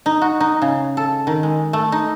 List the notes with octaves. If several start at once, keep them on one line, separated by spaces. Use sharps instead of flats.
D#4
F#4
D#4
C#3
A4
D#3
G#3
A3
D#4